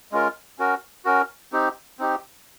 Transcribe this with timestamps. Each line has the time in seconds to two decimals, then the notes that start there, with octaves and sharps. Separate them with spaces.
0.12 G#3 C#4 F4 A#4
0.59 C#4 F#4 A#4
1.05 C#4 F#4 A#4
1.52 C4 D#4 G4
1.99 C4 D#4 G4